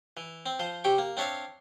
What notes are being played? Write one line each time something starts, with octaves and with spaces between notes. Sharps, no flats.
E3
C4
F3 C5
C3 G4 G5 C#6
A#3
C4 D4 C#5 E5 F5